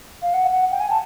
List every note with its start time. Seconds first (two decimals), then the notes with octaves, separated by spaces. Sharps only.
0.22 F5
0.34 F#5
0.52 F#5
0.72 G5
0.80 G#5
0.90 A5